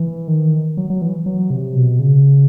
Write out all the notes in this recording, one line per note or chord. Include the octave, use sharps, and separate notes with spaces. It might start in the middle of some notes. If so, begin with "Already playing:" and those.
Already playing: E3
D#3
F#3
F#3
E3
F#3
C3
B2
C#3